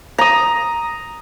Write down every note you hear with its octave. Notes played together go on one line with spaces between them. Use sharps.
A#5 D#6